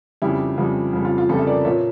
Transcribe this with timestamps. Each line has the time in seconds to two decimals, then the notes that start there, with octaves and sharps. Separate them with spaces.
0.22 F2 C#3 G3 E4 G4
0.58 F2 C#3 G3
0.93 F2 C#3 G3
1.05 F4
1.18 F4
1.29 F2 C#3 G3 F4 A4
1.39 E5
1.47 A#4 D5
1.65 A#2 F3 A#3 C#5 E5